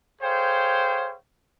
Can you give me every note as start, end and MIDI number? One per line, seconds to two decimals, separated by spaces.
0.22 1.17 68
0.22 1.17 69
0.22 1.17 72
0.22 1.17 73
0.22 1.17 77
0.22 1.17 79